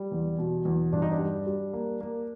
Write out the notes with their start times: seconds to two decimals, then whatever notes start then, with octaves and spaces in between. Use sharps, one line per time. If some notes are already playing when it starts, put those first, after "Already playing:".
Already playing: G3
0.12 E2
0.38 B2
0.65 E2
0.92 G2 D4
1.02 D#4
1.12 D4
1.19 G3
1.46 G3
1.73 A#3
2.01 A#3